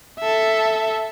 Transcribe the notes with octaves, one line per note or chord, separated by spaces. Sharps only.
A4 E5